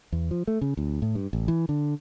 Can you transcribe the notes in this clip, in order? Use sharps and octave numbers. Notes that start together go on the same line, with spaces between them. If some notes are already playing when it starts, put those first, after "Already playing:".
E2
F3
A3
C#3
D2
A2
G2
A1
E3
D3